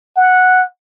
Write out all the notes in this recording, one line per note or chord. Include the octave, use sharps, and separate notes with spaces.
F#5